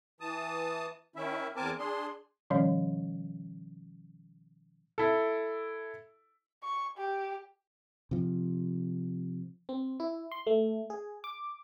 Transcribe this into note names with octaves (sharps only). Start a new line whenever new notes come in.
E3 A5 D#6
D#3 C#4 E4 E5
E2 C4 A#4 G#5 A5 D6
D4 G#4 C6
B2 D#3 F3 G3 C#4 C#5
E4 A4
C#6
G4
C3 F3
C4
E4
C6
A3
G#4
D6